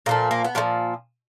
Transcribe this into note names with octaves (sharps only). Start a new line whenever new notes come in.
A#2 F3 A3 A#3
A#3
B3
A#2 F3 A3